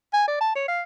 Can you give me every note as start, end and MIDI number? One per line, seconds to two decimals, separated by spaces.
0.13 0.27 80
0.28 0.38 74
0.40 0.54 81
0.55 0.67 73
0.68 0.83 77